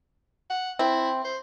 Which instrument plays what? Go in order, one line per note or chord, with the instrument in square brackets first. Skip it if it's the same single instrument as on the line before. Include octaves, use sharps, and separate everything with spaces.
[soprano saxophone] F#5
[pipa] C4 [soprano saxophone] E4
[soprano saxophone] C5